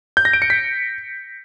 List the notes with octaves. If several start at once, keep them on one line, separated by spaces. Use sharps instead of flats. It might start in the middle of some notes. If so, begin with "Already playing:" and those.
G6
A#6
D7
C#7
B6